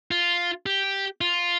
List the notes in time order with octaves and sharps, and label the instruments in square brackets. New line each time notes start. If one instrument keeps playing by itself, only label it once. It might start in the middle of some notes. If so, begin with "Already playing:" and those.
[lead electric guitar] F4
G4
F4